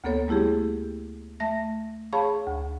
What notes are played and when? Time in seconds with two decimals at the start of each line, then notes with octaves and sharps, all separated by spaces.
0.04 D2 A#3 B3 A4 C#5
0.28 G3 A3 E4 G4 G#4
1.40 A3 E5 A#6
2.13 G#4 C#5 F5 A5 B5 C#6
2.47 D2